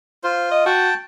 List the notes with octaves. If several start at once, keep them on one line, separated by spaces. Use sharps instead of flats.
F4 C5
D#5
F#4 G5 A5